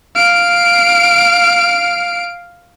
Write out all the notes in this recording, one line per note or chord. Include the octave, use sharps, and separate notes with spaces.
F5 D7